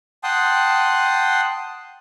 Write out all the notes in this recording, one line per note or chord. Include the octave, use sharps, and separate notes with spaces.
F#5 G5 A5 C6 D#6